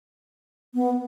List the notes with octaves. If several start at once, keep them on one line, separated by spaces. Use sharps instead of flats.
B3